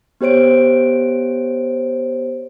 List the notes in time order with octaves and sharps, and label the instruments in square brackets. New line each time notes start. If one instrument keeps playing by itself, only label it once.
[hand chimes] B3 G4 C5 C#5 D7